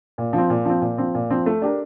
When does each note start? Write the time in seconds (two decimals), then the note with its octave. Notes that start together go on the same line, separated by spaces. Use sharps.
0.18 A#2
0.33 F3
0.38 C4
0.50 A#2
0.65 F3 C4
0.82 A#2
0.98 F3 C4
1.15 A#2
1.30 F3 C4
1.46 A3
1.62 D4 G4 A#4